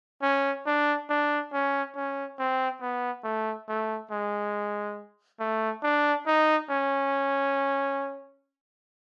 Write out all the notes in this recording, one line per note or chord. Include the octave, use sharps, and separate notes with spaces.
C#4
D4
D4
C#4
C#4
C4
B3
A3
A3
G#3
A3
D4
D#4
C#4